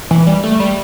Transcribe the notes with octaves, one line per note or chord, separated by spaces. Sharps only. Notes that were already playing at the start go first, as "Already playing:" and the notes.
E3
G3
A3
G3